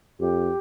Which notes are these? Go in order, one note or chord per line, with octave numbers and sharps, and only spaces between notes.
F2 G4